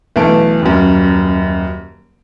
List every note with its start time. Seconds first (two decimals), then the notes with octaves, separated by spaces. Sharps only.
0.16 B1 E3 A3 D7
0.62 D#1 F#2